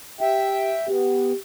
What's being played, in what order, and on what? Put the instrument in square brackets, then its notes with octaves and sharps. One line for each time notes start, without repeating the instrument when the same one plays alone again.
[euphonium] G4 [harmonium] E5 G5
[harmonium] B3 [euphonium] G4